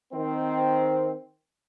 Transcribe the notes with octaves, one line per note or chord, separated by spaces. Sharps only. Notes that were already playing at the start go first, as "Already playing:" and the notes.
D#3 C4